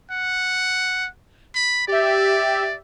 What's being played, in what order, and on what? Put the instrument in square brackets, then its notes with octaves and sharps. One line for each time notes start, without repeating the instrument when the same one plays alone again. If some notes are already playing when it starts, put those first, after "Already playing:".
[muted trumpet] F#5
B5
[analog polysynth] G4 E5 [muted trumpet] D5